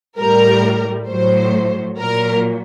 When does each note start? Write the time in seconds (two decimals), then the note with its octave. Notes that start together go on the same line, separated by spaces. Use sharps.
0.18 A2 G3 A#4
1.09 A2 F#3 C5
1.99 A#2 F#3 A#4